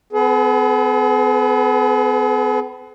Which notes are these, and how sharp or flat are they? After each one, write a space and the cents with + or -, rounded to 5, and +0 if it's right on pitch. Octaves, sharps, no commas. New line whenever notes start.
B3 +45 G#4 +45 B4 +0